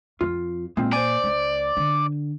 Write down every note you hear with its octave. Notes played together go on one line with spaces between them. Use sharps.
F2 F4
A#2 G#3 C4 F4
C5 D5 G#5
C#2
D3